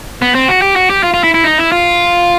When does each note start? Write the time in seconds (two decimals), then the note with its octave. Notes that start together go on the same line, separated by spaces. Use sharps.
0.22 B3
0.35 C4
0.48 F#4
0.62 G4
0.76 F#4
0.90 G4
1.03 F4
1.14 F4
1.24 E4
1.34 E4
1.44 D#4
1.58 E4
1.72 F4